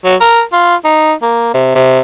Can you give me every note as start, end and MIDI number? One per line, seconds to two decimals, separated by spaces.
0.05 0.15 54
0.21 0.42 70
0.53 0.75 65
0.85 1.13 63
1.22 1.52 58
1.54 1.70 48
1.75 2.01 48